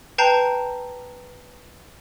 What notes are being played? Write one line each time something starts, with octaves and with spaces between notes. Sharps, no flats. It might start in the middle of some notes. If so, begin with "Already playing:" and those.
B4 G5 A5 A#5 G6 C7